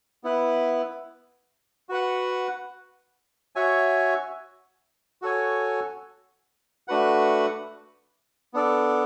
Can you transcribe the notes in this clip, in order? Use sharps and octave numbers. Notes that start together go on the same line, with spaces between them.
B3 E4 B4
F#4 B4 F#5
F#4 C#5 E5 G#5
F#4 A4 C#5 G#5
A3 D4 F#4 B4 F#5
B3 D4 A4 D5